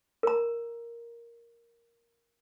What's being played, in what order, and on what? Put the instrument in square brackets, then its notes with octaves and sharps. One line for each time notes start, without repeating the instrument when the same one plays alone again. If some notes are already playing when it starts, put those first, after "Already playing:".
[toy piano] A#4 A#5